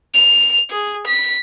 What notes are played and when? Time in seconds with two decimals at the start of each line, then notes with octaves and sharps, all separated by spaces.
0.14 F7
0.71 G#4
1.07 B6